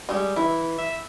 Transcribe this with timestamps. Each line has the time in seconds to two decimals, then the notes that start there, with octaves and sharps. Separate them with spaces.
0.09 G3 G#3
0.36 E3 E4
0.78 E5